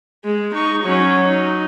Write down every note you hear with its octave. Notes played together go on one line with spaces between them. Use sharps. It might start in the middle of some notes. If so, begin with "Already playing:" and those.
G#3
D#4 C#6
F#3 C#4
D#4